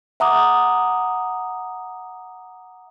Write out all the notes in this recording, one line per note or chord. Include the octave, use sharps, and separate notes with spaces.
E5 F#5 A#5 D6 D#6